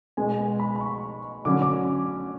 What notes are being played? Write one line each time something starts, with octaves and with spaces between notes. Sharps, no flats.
B2 G#3 B3 G#5
G#5
B5
B5
C#6
D3 F#3 C#4 D6
D6